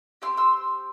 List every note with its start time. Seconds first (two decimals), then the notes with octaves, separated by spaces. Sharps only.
0.22 C4 E4 G4 C6 E6
0.37 C6 E6